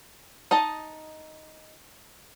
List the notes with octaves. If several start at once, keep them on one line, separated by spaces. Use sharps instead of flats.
D#4 D#5 A5